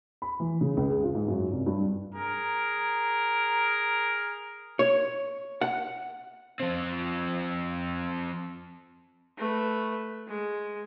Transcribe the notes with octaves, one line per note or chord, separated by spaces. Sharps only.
B5
E3
C#3
C#2
G#4
F4
G#2
F#2
C2
G2
G#4 A#4
C#5
F#5
F3 C4
A3 B4
G#3